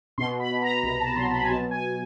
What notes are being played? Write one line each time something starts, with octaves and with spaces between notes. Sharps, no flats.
B2 C6
B5
B2
A#5
C2 A#5
A5
F#3 C6
B5
G#5
B2 A5
G#5